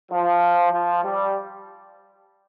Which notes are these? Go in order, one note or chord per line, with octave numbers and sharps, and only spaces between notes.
F3
F3
G3